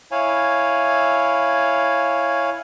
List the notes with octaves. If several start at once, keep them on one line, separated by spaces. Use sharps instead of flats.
E4 C#5 F5 G#5